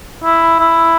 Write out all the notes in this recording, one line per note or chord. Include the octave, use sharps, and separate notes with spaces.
E4
E4